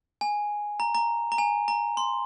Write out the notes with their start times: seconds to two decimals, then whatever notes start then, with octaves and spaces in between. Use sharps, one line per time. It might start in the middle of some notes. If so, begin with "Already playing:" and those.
0.21 G#5
0.80 A#5
0.95 A#5
1.32 A#5
1.38 G#5
1.68 A#5
1.97 C6